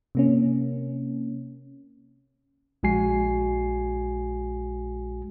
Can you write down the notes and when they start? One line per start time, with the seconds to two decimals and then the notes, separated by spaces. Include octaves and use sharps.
0.15 C3 A#3 C#4
2.83 A#1 G#3 F#4 G#5 C7